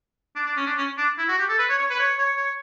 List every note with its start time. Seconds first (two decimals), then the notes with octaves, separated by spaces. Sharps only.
0.35 D4
0.46 D4
0.57 C#4
0.66 D4
0.77 C#4
0.97 D4
1.18 E4
1.28 F#4
1.38 G4
1.49 A4
1.59 B4
1.69 C#5
1.79 C#5
1.90 B4
1.99 C#5
2.18 C#5
2.36 C#5